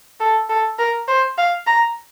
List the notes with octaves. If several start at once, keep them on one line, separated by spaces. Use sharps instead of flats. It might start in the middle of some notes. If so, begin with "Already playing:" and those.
A4
A4
A#4
C5
F5
A#5